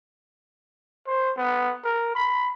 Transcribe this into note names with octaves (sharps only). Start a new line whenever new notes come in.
C5
B3
A#4
B5